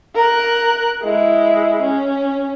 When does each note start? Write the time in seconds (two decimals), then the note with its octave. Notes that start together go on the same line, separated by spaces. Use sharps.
0.15 A#4 F#6
1.03 G#3 E4
1.82 C#4